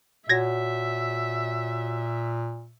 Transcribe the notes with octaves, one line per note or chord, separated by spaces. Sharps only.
A#2 F#4 C#5 E5 F#5 G#6 A#6